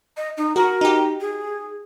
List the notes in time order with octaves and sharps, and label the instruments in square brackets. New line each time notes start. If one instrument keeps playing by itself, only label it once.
[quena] D#5
D#4
[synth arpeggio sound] F#4 [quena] A#4
[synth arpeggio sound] D#4 G4
[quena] G#4